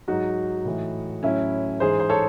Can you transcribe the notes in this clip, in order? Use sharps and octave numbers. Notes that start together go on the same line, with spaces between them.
G#2 F#3 D#4 F#4
A2 E3
A2 F#3 C#4 E4
G#2 E3 G#4 C5
C5
A4 C#5